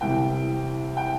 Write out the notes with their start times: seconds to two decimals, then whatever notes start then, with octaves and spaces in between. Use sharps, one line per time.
0.01 C2 C3 E3 G5
0.97 G5